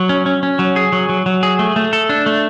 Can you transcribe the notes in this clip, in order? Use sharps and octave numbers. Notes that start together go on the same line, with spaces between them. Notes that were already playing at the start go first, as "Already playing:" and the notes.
Already playing: F#3
C#4
C#4
C#4
F#3
G#4
F#3
F#3
F#3
G#4
A3
A3
A4
D4
A3